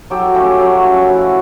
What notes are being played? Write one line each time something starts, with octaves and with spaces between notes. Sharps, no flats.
F#3 G4 A4
A3 C#4 F4 G4
F#3
A3 C#4 F4
F3 E4 F#4